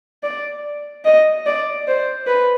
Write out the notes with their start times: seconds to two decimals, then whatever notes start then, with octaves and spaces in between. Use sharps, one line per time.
0.23 D5
1.05 D#5
1.47 D5
1.88 C5
2.27 B4